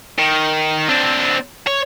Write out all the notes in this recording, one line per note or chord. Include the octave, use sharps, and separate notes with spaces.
D#3
C4 D4
C#5